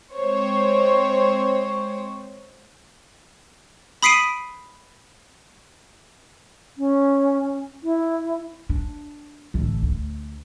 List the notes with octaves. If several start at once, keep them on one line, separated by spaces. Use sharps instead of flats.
G#3 C4 C5 C#5
B5 D#6 B6 C7 D7 D#7
C#4
E4
D4
A1 D3
D2